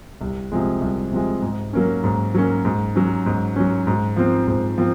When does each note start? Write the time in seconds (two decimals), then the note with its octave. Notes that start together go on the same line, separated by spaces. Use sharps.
0.21 C2
0.52 C3 F3 G#3
0.81 C2
1.12 C3 F3 G#3
1.42 G#2
1.73 F#3 A#3 C#4
2.04 G#2
2.35 F#3 A#3 C#4
2.65 G#2
2.95 F#3 C#4
3.26 G#2
3.56 F#3 C#4
3.87 G#2
4.16 F3 C4
4.47 G#2
4.78 F3 C4